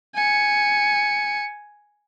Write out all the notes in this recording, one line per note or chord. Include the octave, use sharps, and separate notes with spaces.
G#5 C#7